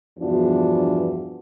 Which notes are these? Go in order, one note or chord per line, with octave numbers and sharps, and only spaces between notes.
E2 G2 B2 F3 D4 F#4